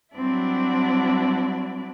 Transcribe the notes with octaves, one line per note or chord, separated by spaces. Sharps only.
F#3 G3 C4 D4 E4 D5